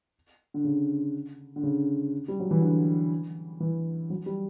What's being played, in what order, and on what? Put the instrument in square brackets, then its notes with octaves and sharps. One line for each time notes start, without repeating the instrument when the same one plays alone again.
[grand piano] D3
C#3
D3
C#3
G3
F#3
E3
D3
E3
F#3
G3